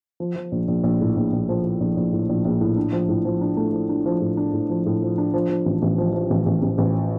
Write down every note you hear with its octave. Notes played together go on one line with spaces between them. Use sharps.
F3
F3
A#1
A#1
A#1
A2
A#1
A#1
F3
F3
A#1
A#1
A2
A#1
A#1
A2
D4
F3
A2
F3
D4
A3
F3
D4
F3
A2
D4
A2
F3
A2
F3
D4
F3
F3
A1
A1
F3
F3
A1
A1
A1
A1